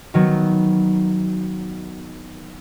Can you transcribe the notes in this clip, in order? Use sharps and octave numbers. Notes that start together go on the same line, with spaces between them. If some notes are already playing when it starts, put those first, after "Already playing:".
D#3 F#3 B3